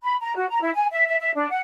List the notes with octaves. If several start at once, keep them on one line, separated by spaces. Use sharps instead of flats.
B5
A#5
F#4
A#5
E4
G#5
E5
E5
E5
D4
F#5